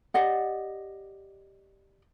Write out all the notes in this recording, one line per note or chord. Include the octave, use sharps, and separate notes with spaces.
G4 D5 D#5 F#5